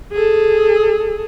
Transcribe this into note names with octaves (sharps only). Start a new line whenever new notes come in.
G#4 A4